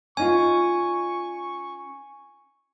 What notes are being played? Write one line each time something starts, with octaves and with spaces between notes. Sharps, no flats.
C#4 D#4 F4 G#5 C#6